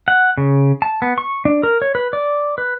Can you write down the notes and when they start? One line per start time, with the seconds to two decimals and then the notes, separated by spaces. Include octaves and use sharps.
0.08 F#5
0.38 C#3
0.82 A5
1.02 B3
1.18 C#6
1.45 D4
1.63 A#4
1.82 C#5
1.95 B4
2.13 D5
2.58 B4